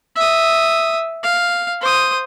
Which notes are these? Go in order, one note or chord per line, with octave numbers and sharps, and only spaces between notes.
E5 D#6
F5
C5 D#6